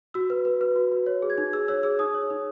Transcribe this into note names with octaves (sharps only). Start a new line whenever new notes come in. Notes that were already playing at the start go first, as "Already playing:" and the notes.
F#4 E6
B4
B4
B4
F#4
F#4
C#5
G#4
G#6
D#4
G#4 E6
C#5 E6
G#4 E6
D#4 D#6
C#5
D#4